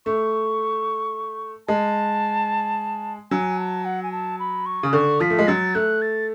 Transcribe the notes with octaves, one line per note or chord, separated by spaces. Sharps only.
A3 C#6
G#3 A5
F#3 G#5
A5
F#5
G#5
A5
B5
C#6
C#3
D3 C#6
F3 B6
A3
G#3
F#3 A6
A3 F#6
A6